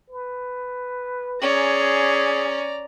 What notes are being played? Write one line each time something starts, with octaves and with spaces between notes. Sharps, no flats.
B4
C#4 G#4 D5 A#5